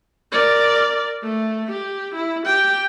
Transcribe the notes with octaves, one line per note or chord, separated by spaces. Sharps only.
A#4 D5
A3
G4
E4
G4 G5